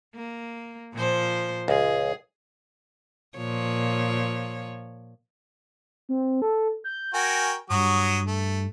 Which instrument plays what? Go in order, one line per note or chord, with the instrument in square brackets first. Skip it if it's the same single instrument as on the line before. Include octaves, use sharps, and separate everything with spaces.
[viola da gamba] A#3
A#2 F3 C5
[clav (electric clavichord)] C#2 [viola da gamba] G#4
[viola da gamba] A#2 F3 C#5
[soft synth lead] C4
A4
G6
[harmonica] F#4 A#4 G5 [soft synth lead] G#5
[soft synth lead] G2 [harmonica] F#3 F#4 D#6
[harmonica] A3